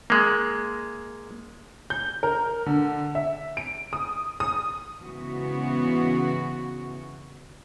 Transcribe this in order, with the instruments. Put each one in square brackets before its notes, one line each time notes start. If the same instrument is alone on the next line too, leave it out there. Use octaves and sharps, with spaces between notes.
[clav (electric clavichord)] G#3 A#3
[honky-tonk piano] G6
A#4
D3
E5
D7
D#6
D#6
[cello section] G#2 C#3 E3 B3 F#4